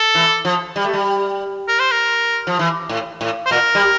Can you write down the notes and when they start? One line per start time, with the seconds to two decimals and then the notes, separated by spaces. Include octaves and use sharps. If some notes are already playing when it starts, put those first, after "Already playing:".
Already playing: A4
0.15 E3
0.45 F3
0.76 G3
0.84 A3
0.93 G3
1.68 A#4
1.79 C5
1.91 A#4
2.47 F3
2.59 E3
2.89 A2
3.21 A2
3.46 C5
3.51 A#2 A#4
3.75 G3